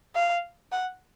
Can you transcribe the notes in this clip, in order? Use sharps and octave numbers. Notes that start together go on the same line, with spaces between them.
F5
F#5